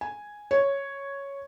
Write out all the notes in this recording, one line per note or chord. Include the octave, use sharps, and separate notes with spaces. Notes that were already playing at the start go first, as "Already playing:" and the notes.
G#5
C#5